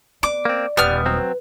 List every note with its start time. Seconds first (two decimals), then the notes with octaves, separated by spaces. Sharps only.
0.23 B3 D5 D6
0.45 A#3 C4
0.77 D#1 G3 B3 F6
1.06 F#3 C4 B4